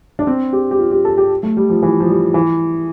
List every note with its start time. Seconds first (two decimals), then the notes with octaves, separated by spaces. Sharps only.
0.19 D4
0.27 C4
0.53 G4
0.71 G4
0.79 F4
0.91 G4
1.05 A4
1.18 G4
1.43 A3
1.57 G3
1.70 F3
1.83 E3
2.00 F3
2.09 G3
2.34 E3